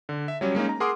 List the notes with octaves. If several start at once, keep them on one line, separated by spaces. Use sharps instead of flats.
D3
E5
F#3 G3 C#4
G#3 A#3 C#4 D#4
A#5
G#4 A#4 F#5 C6 D6 D#6